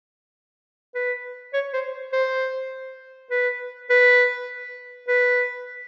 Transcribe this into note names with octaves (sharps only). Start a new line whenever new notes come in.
B4
C#5
C5
C5
B4
B4
B4